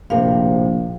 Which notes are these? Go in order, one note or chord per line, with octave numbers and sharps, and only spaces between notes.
A#1 A2 C3 A#4 F5